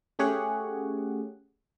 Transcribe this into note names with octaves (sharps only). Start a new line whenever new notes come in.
A3 C#4 G4 G#4 C#5 F#5